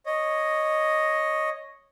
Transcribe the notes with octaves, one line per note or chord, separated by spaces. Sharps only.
C#5 D#5